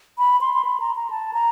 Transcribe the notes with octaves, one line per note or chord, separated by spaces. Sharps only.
B5
C6
C6
B5
A#5
A#5
A5
A#5